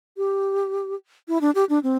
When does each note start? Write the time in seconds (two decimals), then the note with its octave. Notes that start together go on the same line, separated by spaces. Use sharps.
0.17 G4
1.28 E4
1.41 D4
1.55 G4
1.69 D4
1.83 C4